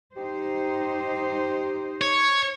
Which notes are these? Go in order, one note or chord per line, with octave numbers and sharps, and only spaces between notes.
D#4 G4 C5
C#5